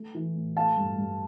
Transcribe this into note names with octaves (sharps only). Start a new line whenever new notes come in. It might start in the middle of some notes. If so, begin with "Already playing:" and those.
Already playing: A3
E3
A2
A3 F5 A5
G2
G2